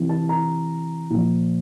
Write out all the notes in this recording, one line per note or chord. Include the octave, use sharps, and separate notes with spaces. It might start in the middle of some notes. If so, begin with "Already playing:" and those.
Already playing: C3 E3
A5
A#5
A#2 F3